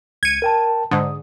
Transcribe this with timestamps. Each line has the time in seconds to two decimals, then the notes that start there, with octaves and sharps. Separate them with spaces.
0.23 C#2 G#6 C#7 D#7
0.42 A#4 G5 A5
0.91 G#2 D3 D#6